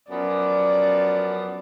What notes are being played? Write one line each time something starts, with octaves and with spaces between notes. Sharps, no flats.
F#2 F3 B3 D5